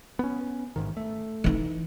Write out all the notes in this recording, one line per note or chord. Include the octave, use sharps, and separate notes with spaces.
B3 C#4
A1 G#2 D#3
A3
E3 D#4